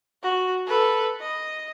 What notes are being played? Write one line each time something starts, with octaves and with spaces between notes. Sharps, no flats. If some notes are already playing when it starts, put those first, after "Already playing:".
F#4
A4 B4
D#5